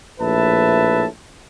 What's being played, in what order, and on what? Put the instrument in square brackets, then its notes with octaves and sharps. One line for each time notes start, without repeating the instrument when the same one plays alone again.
[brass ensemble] A#1 A2 B4 E5 A5